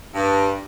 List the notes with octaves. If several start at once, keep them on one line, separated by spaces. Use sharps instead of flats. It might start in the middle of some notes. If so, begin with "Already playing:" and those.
G2